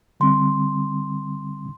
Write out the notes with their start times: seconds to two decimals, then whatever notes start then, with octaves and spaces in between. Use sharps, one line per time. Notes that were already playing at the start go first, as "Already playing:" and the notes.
0.20 D3 G3 C4 C6